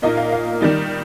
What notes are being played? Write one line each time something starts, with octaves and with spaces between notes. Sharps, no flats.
A#2 A#3 D#4 D#5
F5
F5
D#3 G3 D#4